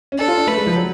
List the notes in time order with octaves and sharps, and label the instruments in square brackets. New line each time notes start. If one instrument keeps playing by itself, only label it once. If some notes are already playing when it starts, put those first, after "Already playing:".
[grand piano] C#4
[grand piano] D4 [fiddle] A4
[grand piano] F4
D4
[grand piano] A3 [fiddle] B4
[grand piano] G#3
F3
F#3